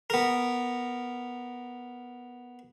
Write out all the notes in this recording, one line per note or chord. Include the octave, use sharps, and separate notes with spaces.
B3 A#4